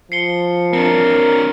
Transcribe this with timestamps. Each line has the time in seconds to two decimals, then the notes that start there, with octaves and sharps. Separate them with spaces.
0.12 F3 C7 C#7 G7
0.73 C4 D4 A#4 C#7